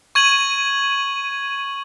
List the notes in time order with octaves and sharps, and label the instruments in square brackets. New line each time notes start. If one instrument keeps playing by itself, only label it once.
[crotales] C#6 G#6 D#7 F#7